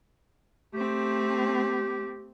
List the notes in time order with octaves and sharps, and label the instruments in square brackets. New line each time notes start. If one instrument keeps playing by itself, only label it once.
[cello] A3 C4 [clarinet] G4